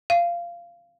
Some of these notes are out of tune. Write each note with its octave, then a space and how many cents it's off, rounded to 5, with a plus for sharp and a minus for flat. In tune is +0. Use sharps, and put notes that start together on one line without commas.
F5 -15